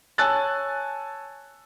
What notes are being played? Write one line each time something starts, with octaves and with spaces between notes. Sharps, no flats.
C#5 G#5 A5 E6 F#6 A6